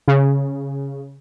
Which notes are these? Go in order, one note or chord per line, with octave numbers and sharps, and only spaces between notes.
C#3